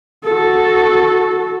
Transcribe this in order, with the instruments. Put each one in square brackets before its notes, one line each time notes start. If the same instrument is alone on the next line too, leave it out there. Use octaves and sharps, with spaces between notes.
[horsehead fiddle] F#4 A4